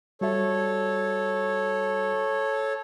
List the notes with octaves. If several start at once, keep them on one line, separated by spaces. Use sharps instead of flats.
G3 F#4 A4 C#5 E5